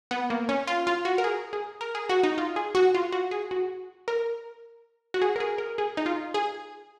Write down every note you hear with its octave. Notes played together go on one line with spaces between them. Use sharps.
B3
A#3
C#4
F4
F4
F#4
A#4
G#4
G#4
A#4
G#4
F#4
D#4
F4
G#4
F#4
F4
F#4
G#4
F#4
A#4
F#4
G#4
A#4
G#4
A#4
G#4
D#4
F4
G#4